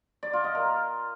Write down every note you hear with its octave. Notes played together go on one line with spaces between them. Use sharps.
D5
F4
D#5
A#4